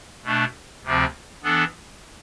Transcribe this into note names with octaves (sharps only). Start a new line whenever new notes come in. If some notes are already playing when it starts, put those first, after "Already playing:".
B2 A3 D4
D2 C3 F3 C4
E3 B3 D4 A4